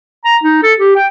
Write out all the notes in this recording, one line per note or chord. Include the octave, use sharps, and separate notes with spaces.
A#5
D#4
A4
G4
G5